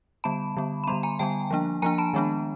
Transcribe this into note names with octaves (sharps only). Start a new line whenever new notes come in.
D3 G3 B3 A5 B5
D3 G3 B3
B5
D3 G3 B3 A#5 C6
G#5 A#5
D3 G3 B3 G5 A5
F3 A#3 D4
F3 A#3 D4 G#5 A#5
A5 B5
D#3 G#3 B3 D4